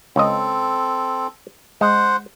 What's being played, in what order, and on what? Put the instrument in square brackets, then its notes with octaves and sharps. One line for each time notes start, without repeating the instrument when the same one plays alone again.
[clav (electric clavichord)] C#2 D#5 [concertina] C4 A4
[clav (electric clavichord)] G#3 [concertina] C5 F#5